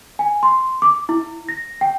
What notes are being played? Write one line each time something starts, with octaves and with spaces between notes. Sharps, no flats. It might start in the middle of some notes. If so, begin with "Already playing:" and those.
G#5
C6
D6
E4
A#6
G5